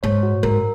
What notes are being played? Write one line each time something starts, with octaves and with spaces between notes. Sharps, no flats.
G#2 C#5
F#4
G#2 A#4